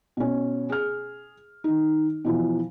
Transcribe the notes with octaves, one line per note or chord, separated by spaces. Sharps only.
B2 C#4
G#4 F6
D#3 D#4
B2 E3 F3